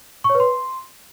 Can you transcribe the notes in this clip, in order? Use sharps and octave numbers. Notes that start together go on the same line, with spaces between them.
C#6
C#5
B4
C6